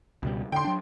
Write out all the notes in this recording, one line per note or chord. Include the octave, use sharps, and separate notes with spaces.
C#2 B2 G3
D3 G5 C6
F#3 D4